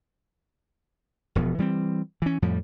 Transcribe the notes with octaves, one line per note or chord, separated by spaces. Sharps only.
E1 B2 F3
E3 G3 A#3 C4
E3 C#4
F2 A2 F3 G3